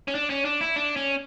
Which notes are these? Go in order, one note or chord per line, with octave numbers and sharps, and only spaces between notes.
C#4
D4
C#4
D4
E4
D4
C#4